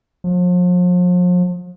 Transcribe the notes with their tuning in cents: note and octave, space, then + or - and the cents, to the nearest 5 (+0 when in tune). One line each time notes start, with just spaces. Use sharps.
F3 +40